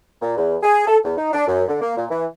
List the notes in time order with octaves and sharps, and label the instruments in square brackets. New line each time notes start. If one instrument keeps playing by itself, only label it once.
[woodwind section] A#2
E2
G#4
A4
E2
D#4
D4
F#2
D3
A#3
A#2
E3